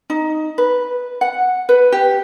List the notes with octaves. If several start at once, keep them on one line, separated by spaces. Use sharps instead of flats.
D#4
B4
F#5
B4
G4